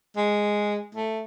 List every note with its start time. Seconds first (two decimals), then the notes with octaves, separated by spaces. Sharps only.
0.16 G#3
0.95 A3